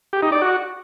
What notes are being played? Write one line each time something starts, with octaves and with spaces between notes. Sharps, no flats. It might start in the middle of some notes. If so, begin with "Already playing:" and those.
G4
D#4
D5
F#4